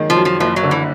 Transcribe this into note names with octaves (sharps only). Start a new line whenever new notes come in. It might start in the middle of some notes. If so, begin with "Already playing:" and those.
Already playing: F#2 D#3 G#3
F3
F#2
F3
F#1 F3
F#3
D3
E3